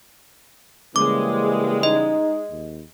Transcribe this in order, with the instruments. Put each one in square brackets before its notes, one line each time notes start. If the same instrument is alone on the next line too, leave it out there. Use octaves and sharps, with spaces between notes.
[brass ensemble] C#3 E3 G3 [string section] G#3 [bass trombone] A#3 [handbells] D6
[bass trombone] D#4 [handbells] D#5
[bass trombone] D#2